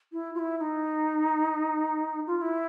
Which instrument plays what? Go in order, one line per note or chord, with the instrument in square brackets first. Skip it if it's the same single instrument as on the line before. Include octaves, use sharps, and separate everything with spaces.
[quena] E4
F4
E4
E4
D#4
F4
F4
E4